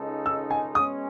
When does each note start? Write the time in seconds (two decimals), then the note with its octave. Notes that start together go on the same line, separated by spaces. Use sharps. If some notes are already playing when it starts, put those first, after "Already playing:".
Already playing: C#2 C#3 G#3 D#4 A4
0.26 E6
0.51 G#5
0.75 B2 G#3 C#4 D#6